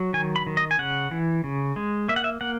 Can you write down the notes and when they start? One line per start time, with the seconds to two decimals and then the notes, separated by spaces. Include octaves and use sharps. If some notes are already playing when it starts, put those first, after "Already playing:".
Already playing: F#3
0.13 D#3 G#5
0.36 B5
0.47 D#3
0.57 D#5
0.71 G#5
0.79 C#3 F#5
1.11 E3
1.44 C#3
1.76 G#3
2.08 A#3 E5
2.16 F#5
2.24 E5
2.41 A#3 F#5